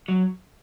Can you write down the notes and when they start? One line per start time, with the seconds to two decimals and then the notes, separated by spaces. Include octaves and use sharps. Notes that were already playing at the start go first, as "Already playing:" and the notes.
0.08 F#3